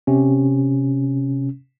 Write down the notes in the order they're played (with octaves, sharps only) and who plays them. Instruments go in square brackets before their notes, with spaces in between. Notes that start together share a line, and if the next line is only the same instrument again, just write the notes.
[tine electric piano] C3 C#4